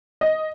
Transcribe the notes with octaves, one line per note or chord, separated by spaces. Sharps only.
D#5